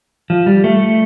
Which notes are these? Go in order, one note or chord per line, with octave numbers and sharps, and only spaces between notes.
F3
G3
A3